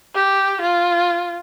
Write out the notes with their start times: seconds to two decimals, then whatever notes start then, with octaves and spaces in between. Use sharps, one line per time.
0.15 G4
0.61 F4